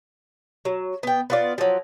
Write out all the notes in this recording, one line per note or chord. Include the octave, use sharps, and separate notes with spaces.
F#3
B3 G5
B3 F4 D5
F3 F#3